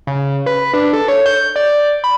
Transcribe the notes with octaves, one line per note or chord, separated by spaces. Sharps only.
C#3
B4
D4
A4
C#5
G6
D5
B5